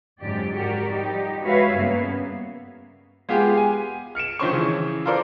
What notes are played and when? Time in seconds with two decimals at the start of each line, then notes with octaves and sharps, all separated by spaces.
0.22 F2 G#2 D3 F#3 G4 D5
0.55 F#4 G4 A#4 D5
0.93 F3 G3 D#4 G4
1.42 G#3 F#4 B4 C#5 E5 F5
1.74 G2 C#3 A#3 B3
3.29 G#3 B3 F4 G4 G#4
3.57 G#5
4.15 F6 C#7 D7 E7
4.40 D#3 F3 C#4 C5 C6 C#6
4.51 C#3 E3
5.06 F4 A4 A#4 C5 D5